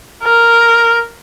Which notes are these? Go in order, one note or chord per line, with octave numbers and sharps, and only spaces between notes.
A#4